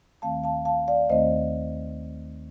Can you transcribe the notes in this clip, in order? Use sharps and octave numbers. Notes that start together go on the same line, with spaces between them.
D#2 D#3 A3 C4 F5 A5
F5 A5
F5 A5
D5 F5
D#2 D#3 A3 C4 C5 D#5